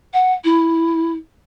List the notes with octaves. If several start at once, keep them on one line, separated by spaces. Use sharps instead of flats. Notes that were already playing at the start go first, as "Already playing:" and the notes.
F#5
E4